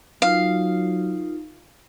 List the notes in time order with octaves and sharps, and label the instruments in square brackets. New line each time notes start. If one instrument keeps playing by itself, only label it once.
[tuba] F#3 [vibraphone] D#4 F4 A#4 [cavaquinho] F5